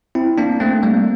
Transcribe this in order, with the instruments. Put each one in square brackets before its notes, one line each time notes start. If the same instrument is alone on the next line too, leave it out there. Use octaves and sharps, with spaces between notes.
[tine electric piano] C4 E4
A#3 D4
A3 C4
G3 A#3